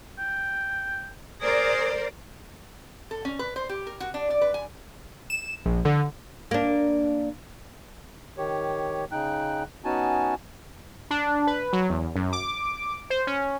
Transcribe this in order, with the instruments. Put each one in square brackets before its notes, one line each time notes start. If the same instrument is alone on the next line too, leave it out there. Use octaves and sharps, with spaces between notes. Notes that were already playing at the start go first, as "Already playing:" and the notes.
[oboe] G5
[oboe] G#4 [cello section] A#4 C5 D5
[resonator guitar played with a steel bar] A4
C#4
B4
C5
G4
A#4
F#4
D4
D5
B4
G#5
[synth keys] E7
A#1
D3
[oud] A#3 D4
[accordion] D#3 G4 C#5
C#3 D#4 G5 F#6
B3 C#4 D#4 F#4 G#5 A5
[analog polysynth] D4
B4
F#3
E2
F#2
D6
C5
C#4